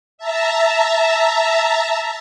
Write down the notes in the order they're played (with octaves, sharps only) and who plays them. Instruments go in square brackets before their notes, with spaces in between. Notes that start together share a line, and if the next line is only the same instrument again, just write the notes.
[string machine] E5 A5 A#5